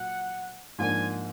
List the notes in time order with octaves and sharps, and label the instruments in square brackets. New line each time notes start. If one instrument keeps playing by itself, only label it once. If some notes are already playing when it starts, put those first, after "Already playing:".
Already playing: [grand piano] A#2 F#3 [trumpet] F#5
[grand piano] G#2 F3 A#3 D4 [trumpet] G#5